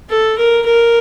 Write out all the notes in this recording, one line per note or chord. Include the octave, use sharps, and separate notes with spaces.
A4
A#4
A#4